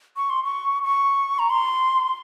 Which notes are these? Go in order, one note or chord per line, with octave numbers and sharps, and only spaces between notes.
C#6
C6
C#6
C#6
A#5
C6